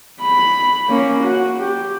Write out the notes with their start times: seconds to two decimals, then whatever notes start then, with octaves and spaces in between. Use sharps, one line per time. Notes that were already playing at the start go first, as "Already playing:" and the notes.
0.22 B5
0.88 A#3 C#4
1.24 F#4
1.60 G4